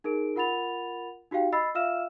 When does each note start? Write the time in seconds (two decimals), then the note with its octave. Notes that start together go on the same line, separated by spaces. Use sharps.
0.04 D#4 G#4 A#4 D7
0.36 F4 A#4 F#5 B5 A6 F7
1.31 D#4 F#4 G4 F5 G5
1.53 D#5 B5 E6 A6 C7
1.75 F4 E5 F5 E6 F6 E7